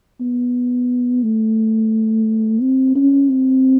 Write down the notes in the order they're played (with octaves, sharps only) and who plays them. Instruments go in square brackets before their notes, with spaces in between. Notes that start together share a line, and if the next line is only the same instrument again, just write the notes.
[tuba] B3
A3
C4
C#4
C4